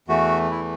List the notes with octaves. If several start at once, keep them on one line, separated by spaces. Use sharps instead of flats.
E2 E3 A3 F#4
E4